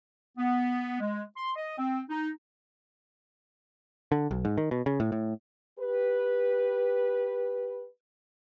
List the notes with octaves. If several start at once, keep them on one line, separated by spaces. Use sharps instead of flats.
B3
G#3
C6
D#5
C4
D#4
D3
B1
G#2
D#3
B2
C#3
A2
A2
G4 B4